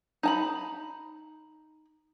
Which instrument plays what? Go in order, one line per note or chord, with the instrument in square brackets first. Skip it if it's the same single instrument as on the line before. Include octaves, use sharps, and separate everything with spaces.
[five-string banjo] D#4 A5 B5